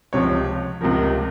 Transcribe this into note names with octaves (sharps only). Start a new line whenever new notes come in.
C#2 C3 F3 C#5
C#2 C3 F3 A#4